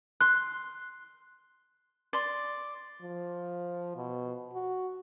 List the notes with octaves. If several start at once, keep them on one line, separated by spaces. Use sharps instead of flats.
C6 F#6
D5 C6
F3
B2
F#4